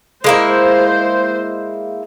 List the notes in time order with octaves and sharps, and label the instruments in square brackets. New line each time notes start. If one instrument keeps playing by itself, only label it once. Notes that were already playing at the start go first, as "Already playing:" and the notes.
[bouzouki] G#3 A#3 E4 [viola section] C5